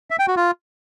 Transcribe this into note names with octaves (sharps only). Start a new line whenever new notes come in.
E5
G5
F#4
F4